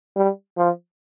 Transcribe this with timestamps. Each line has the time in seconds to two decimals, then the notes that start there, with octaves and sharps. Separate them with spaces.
0.16 G3
0.57 F3